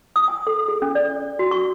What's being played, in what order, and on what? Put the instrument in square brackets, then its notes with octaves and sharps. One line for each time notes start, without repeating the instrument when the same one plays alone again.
[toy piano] D#6
G#5
A4
G#4
C#4
D5
F#4
C#6